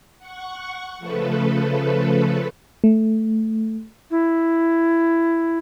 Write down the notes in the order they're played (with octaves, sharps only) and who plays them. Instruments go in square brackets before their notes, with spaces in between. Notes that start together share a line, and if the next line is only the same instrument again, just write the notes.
[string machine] F#5 C#6
C#3 F3 A3 A4 B4
[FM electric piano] A3
[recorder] E4